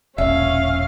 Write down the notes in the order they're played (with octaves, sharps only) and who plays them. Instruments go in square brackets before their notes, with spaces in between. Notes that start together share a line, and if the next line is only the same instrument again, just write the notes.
[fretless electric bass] E1 A#1 [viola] C#4 F5 [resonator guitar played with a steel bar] E5